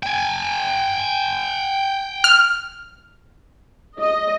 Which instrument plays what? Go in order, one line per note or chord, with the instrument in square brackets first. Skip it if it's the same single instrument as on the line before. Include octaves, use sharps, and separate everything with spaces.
[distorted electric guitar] G5 G#5
[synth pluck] F6
[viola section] D#5